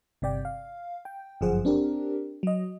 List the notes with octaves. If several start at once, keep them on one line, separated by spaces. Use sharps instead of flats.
G1 C3 D5 G5
F5
G5
G1 F#2 F3 G#4 C5 F#5
C4 D4 G4 A#4
F#3 D#5